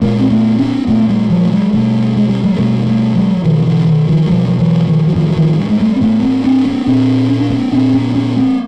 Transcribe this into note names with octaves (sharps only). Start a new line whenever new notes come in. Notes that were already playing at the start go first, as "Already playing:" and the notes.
A#2 G#3 A#3
C4
A3 B3
B3 C#4
A#2 A3 B3
A#3
G3 A3
F3 G3
A3
F#3 G#3
B2 G3 A3
G#3
G3
F#3 G#3
G#3
B2 G3 A3
A#3
G3 A3
F#3 G#3
F#3
B2 D#3 F3
F3
D3 E3
D#3
D#3 F3
F#3
B2 F3 G3
F3
E3 F#3
D#3 F3
F#3
A2 D#3 F3
F#3
D#3 F3
G3
G#3
G3 A3
C4
A2 A3 B3
A#3 C4
C4 D4
B3 C#4
A#2 C4 D4
C#4
D4
B3 C#4
A#2 C4 D4
B3 C#4
B3 C#4
A#3 C4